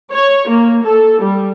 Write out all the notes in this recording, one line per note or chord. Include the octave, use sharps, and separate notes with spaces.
C#5
A#3
A4
G3